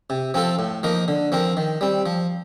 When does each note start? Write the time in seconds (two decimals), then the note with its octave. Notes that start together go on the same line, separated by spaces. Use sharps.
0.10 C3
0.34 F3 C4 F4 A4
0.59 A2
0.83 F3 A#3 D#4 A#4
1.08 D3
1.32 F3 C4 F4 A#4
1.57 D#3
1.81 G3 C4
2.06 F3